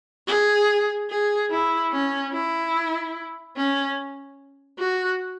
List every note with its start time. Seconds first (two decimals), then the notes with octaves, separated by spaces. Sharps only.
0.28 G#4
1.10 G#4
1.51 E4
1.92 C#4
2.33 E4
3.57 C#4
4.79 F#4